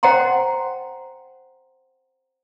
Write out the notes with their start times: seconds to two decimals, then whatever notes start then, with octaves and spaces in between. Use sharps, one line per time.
0.03 C5 F#5 G5 A#5 C6